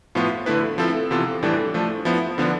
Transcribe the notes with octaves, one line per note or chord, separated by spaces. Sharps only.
A2 F3 B3 F4
D3 A3 E4 B4
F3 C4 E4 A4
C3 E3 B3 F4 A4
A2 E3 G3 D4 A4
F3 A3 D4
F3 B3 E4
D3 F3 B3 D4